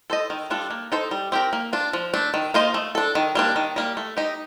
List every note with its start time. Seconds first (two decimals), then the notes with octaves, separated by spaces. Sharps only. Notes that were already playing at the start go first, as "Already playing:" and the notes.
0.10 A4 C5 D#5
0.30 D#3
0.50 G3 D4 F4 A4
0.70 A#3
0.92 D#4 A4 C5
1.11 G3
1.32 C4 G4 A#4
1.53 A#3
1.73 D4 F4
1.93 F3
2.14 A3 D4
2.34 D#3
2.54 A#3 F4 C5 D#5
2.74 A3
2.95 D4 A4
3.15 D#3
3.35 G3 A#3 D4
3.56 D#3
3.76 G3 A#3
3.97 A3
4.17 D#4 G4